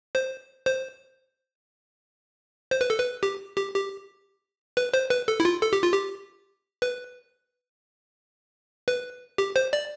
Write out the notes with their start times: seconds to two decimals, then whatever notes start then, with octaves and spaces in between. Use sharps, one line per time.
0.15 C5
0.66 C5
2.71 C5
2.81 B4
2.90 A4
2.99 B4
3.23 G4
3.57 G4
3.74 G4
4.77 B4
4.94 C5
5.10 B4
5.28 A4
5.40 E4
5.45 F4
5.62 A4
5.73 G4
5.83 F4
5.93 G4
6.82 B4
8.88 B4
9.38 G4
9.56 C5
9.73 D5